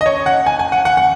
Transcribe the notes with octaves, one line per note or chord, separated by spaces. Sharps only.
D#5
C#5
F#5
G#5
G#5
F#5
F#5
F#5